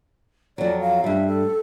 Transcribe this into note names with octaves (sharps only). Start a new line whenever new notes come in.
F2 F#3 D5
F5
G2 G3 E5
A4